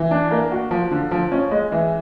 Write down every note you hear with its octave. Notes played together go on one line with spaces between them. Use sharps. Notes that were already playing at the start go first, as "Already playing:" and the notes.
Already playing: E3
D4
A#3
F#4
F3
D3
F3
C#4
G#3
E3